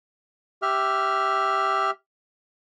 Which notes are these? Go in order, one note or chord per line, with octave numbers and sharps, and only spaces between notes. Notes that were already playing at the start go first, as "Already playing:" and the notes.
G4 E5 F6